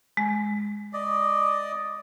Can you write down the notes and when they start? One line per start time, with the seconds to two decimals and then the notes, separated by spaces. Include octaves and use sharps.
0.17 G#3
0.93 D5 D#5